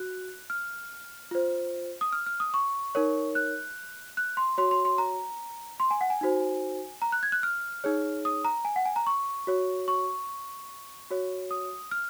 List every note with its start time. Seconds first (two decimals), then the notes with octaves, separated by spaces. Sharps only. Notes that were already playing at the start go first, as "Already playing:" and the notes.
Already playing: F#4 F#6
0.50 F6
1.31 F4 C5
2.01 D#6
2.13 F6
2.26 F6
2.40 D#6
2.54 C#6
2.95 D#4 A#4 C#5
3.35 F#6
4.17 F#6
4.37 C6
4.58 F#4 C#5 C6
4.71 C6
4.85 C6
4.98 A#5
5.80 C6
5.91 G#5
6.01 F#5
6.10 G#5
6.21 D#4 F#4 C5
7.02 A#5
7.12 F#6
7.23 G#6
7.32 F#6
7.43 F6
7.84 D#4 G#4 C#5
8.25 D#6
8.45 A#5
8.65 G#5
8.76 F#5
8.85 G#5
8.96 A#5
9.07 C#6
9.47 F#4 C#5
9.88 C#6
11.10 F#4 C#5
11.51 D#6
11.91 F6